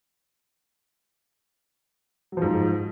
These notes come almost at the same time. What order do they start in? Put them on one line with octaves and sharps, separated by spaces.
F#3 F3 G#2